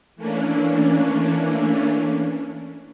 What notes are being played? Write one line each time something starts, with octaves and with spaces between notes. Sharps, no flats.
E3 A3 A#3 C#4 D4